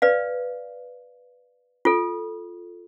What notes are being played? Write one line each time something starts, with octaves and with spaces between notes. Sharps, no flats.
B4 D5 F5
F4 A4